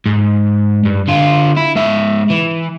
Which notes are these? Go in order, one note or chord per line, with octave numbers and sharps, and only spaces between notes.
G#2
G2
D3 F4
E4
G#2 E5
E3